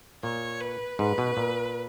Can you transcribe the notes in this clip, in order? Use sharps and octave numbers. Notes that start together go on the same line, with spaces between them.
A#2 C#5
B4
G#2 B4
B2
A#2